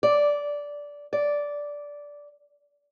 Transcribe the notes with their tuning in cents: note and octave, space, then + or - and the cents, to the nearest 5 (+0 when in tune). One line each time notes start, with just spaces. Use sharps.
D5 -10
D5 -10